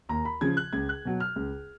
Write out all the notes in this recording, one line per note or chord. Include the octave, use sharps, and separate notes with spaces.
D#2 A#5
B5
C#3 F3 G#6
F#6
C#2 G#6
F#6
B2 F#3
F6
C#2